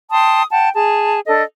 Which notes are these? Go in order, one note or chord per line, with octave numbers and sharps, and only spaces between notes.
G5 A5 C6 D#6
F#5 G5 A5
G#4 A5
D4 A4 D#5